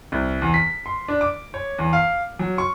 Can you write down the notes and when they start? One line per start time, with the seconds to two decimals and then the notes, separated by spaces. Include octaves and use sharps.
0.12 C2
0.42 E2
0.54 B6
0.86 C6
1.08 D4
1.21 D6
1.54 C#5
1.78 E2
1.93 F5
2.39 F#3
2.58 C#6